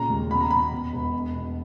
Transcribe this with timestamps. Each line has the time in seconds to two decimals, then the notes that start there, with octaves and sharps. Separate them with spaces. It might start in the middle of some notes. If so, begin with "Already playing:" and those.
Already playing: A#2 C#3 A#5
0.10 D#2
0.31 B2 B5
0.41 A#5
0.51 B2 B5
0.72 E2
0.93 E1
1.14 B2
1.35 B2